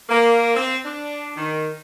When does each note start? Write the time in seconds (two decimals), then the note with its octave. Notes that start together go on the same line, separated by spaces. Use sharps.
0.09 A#3
0.55 C4
0.85 D4
1.36 D#3